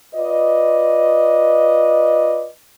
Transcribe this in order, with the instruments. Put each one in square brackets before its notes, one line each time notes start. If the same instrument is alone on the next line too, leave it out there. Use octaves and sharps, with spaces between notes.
[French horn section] F4 B4 D5 D#5